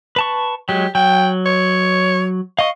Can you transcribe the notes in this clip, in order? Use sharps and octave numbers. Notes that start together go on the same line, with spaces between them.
B4 A5 C#6
F#3 G#3 G4
F#3 G5
C#5
D#5 F5 C#6